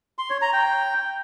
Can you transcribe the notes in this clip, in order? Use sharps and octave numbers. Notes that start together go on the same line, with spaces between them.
C6
C#5
A#5
G5